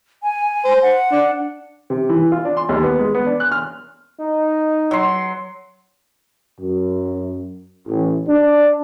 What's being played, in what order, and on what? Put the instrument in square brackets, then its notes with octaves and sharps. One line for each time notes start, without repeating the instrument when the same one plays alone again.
[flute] G#5
[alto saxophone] C5
[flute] F#5
[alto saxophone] D4
[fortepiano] C3
E3
F4
D4
C6
D#2
B3
G#3
B3
D4
F#6
F6
[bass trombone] D#4
[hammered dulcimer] F#3 C6
[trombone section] F#2
A1
D4